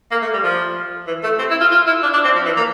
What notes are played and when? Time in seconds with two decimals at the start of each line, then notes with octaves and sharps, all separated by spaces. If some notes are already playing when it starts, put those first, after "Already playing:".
0.11 A#3
0.22 A3
0.33 G3
0.43 F3
1.07 E3
1.23 A3
1.39 C4
1.50 E4
1.61 F4
1.71 F4
1.87 E4
2.03 D4
2.13 D4
2.24 C4
2.35 F3
2.46 E3
2.57 A#3